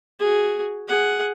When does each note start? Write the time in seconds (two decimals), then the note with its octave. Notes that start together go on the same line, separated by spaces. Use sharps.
0.19 F#4 G#4
0.88 G#4 F#5